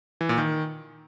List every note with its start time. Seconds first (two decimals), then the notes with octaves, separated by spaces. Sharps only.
0.21 E3
0.29 A#2
0.38 D#3